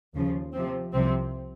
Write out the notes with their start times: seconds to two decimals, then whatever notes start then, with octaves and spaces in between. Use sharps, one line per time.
0.14 D#2 C#3 F3
0.53 C3 F3 C4
0.93 C2 C3 F3 C4